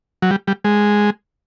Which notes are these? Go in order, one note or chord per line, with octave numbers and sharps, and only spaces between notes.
F#3
G3
G3
G#3